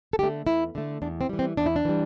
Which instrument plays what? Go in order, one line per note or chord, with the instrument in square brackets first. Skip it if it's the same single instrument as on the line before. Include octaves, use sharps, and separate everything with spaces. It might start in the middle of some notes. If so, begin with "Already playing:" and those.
[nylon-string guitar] A4
D3 A3 G4
E2 E4
D3 A3
E2 D4
C4
E3 G3
C4
E2 D4
E4
D4
E3 G3